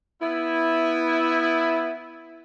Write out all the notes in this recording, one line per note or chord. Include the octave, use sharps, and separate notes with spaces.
B3 E4